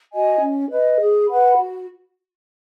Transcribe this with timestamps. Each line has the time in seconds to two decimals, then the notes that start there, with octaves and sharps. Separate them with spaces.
0.13 F#4 D#5 G#5
0.41 C#4
0.70 B4 D#5
1.00 G#4
1.29 B4 F#5 B5
1.57 F#4